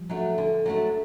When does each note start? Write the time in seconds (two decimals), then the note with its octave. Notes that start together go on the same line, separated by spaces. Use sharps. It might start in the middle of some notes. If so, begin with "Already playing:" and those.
Already playing: F3 G3
0.09 F#3 A3 D4
0.38 D3
0.66 F#3 A3 D4